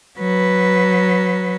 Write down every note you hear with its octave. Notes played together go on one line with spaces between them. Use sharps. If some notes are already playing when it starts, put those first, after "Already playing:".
F#3 B4